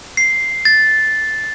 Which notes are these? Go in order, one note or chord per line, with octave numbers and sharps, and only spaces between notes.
C7
A6